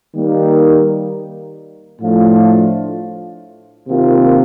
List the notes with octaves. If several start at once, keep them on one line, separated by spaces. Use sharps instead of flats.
D#3 G3 A#3 D#4
A2 F3 A3 D4 F4
C3 D#3 A#3 F4